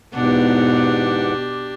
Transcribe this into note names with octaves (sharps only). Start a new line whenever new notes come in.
E2 G#2 B2 D4 G4 F#5